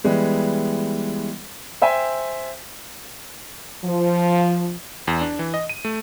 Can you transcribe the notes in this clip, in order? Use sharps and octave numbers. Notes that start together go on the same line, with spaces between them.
E3 G3 G#3 B3
C5 E5 G5 G#5
F3
E2
D4
E3
D#5
D#7
A3